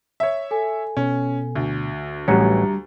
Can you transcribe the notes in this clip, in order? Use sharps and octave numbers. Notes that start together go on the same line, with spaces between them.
C#5 E5
A4 G#5
B2 C#4
D2
A1 F#3 G3 C#4 G4 A#5 C#7